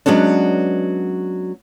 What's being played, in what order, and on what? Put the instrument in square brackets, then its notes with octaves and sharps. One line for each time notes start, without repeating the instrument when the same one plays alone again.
[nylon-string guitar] F#3 G#3 B3 C#4 D4